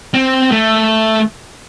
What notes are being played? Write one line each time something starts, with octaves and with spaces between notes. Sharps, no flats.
C4
A3